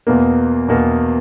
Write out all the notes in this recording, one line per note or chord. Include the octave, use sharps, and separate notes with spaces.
E2 B2 A#3
E2 B2 A#3